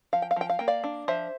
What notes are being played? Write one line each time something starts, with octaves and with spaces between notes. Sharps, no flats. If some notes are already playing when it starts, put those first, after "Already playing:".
F3 F5
G5
F5
F3 G5
F5
A#3 G5
D5 F5
D4
F3 C5 E5